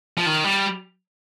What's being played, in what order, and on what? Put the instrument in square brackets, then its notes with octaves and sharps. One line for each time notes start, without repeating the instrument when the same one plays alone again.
[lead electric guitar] F3
D#3
G3